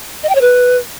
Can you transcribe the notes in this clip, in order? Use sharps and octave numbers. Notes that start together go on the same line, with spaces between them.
D#5
G5
C#5
B4